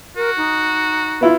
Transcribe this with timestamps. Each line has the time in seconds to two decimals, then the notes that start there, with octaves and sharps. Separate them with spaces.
0.16 F#4 A#4
0.37 D#4
1.21 B3 E4 F4